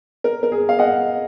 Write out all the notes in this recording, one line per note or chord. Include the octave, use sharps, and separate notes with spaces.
A#4
A#4
G#4
F5
D#5 F#5